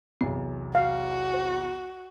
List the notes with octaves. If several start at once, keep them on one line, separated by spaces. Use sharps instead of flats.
B1 E2 C3 C4
F#4 F5
C5